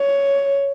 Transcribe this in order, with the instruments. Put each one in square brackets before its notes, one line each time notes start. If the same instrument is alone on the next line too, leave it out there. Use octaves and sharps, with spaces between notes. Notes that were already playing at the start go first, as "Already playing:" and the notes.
Already playing: [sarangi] C#5